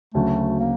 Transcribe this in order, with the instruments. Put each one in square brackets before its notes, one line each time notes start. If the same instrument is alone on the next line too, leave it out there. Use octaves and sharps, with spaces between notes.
[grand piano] D2 C#3 F#3 [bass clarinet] A3
[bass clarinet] A#3